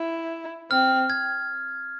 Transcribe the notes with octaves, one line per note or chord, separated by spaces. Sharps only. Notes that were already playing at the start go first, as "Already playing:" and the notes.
Already playing: E4
C4 F6
G#6